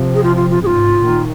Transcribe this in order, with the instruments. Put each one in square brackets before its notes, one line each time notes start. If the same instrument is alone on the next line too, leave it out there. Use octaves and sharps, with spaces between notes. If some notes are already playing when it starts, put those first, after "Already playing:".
Already playing: [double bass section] C3 F3
[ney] G#4
F4
F4
F4
[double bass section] G#2 C3 [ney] F4 G#4
[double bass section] A#2 D#3